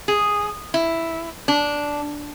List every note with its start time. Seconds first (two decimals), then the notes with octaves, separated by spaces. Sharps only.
0.08 G#4
0.74 E4
1.48 D4